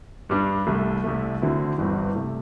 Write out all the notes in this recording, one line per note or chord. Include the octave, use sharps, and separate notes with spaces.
G2 G3 D4
C2 C3 A3
C2 C3 A3
D2 D3 C4 E4
G1 G2 E3 G3 C4
C3 A3